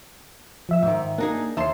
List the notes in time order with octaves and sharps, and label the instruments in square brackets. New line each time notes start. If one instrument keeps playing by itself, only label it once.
[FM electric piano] F3 E5 E6
[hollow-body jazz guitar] G#2 D#3 [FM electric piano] E5
[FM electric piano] A#3 [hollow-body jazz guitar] D4 D#4 G#4
[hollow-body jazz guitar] D#2 A5 C6 [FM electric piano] E5 C7